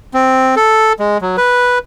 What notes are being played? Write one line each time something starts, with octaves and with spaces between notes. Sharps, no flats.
C4
A4
G#3
F#3
B4